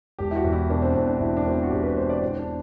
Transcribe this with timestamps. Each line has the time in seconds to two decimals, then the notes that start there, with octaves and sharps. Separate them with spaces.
0.19 E1 G4
0.31 E4
0.36 F#4
0.44 E2
0.53 E4
0.70 B2 D4
0.82 C4
0.95 E2 C4
1.07 D4
1.20 E1 E4
1.37 D4
1.46 B2 C4
1.54 D4
1.63 F#4
1.70 E1 G4
1.83 B4
1.96 B2 C5
2.09 D5
2.22 E2 C5
2.39 D4